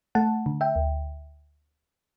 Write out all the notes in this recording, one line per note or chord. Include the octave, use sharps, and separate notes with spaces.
A3 F#5 A5
D3
E5 G5
D2